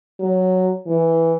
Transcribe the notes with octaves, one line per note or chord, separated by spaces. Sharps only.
F#3
E3